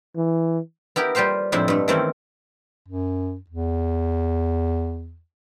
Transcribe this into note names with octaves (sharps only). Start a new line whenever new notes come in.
E3
B3 E4 G4 A#4
G3 F4 G4 C5 F5
F2 A2 G#3 C4 D4 E4
G2 A3
D#3 E3 A3 A#3 C4 C#4
F#2
E2